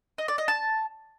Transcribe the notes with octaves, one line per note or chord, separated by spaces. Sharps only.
D#5
D5
D#5
A5